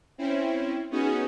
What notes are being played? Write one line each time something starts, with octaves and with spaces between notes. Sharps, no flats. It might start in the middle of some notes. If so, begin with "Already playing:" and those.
C4 C#4 E4
B3 C#4 D#4 F#4 G#4